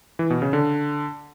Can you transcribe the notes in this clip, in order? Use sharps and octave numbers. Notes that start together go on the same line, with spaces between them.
E3
B2
C#3
D3